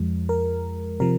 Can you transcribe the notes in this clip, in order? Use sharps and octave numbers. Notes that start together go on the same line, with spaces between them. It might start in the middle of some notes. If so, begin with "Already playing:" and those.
Already playing: F2 F3 G#3
A#4
C3 F3 A#4